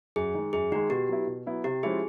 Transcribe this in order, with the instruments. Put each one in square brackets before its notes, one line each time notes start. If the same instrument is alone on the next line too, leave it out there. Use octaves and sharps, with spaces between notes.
[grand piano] F#2 [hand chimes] G#4
[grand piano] D#3 G#3
[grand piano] F#2 [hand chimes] G#4
[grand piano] D#3 [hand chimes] F#4
[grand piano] G#3
[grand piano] B2 [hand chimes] G4
[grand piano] F#3 B3 E4
B2
F#3 B3 E4
[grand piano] C3 [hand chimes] G4
[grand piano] F3 G#3 C#4 E4 [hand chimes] G#4